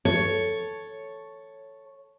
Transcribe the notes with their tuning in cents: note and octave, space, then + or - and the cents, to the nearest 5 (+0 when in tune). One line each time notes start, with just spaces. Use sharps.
A4 +0 C#5 +0